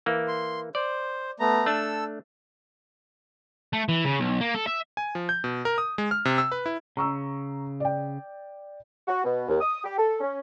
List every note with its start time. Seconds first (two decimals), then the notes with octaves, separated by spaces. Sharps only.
0.06 E3 A#3
0.28 C6
0.75 C5 D5
1.40 A3 B3 A#5
1.66 A3 D4 A4 E6
3.73 A3
3.89 E3
4.04 C#3
4.19 B1
4.41 A#3
4.54 A4
4.67 E5
4.97 G#5
5.15 F3
5.29 G6
5.44 B2
5.65 A#4
5.78 D#6
5.98 G#3
6.11 F6
6.25 C3
6.38 E6
6.52 B4
6.66 E4
6.97 C#3 A#5 C#6 E6
7.80 D5 G5
9.08 F#4
9.24 B2
9.49 D#2
9.61 D#6
9.84 G4
9.98 A4
10.21 C#4